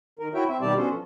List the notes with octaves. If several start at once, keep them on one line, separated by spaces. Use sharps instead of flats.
D#3 A#4
E4 F#4 C#5 E5 G5
C4 E5
B2 D#3 G3 G4 D5 A5
B3 C#4 D4 F#4 A4 C5
F3